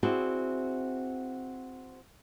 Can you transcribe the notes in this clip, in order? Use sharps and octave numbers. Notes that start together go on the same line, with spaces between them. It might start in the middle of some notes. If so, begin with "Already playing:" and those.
C4 E4 F#4 G#4 D5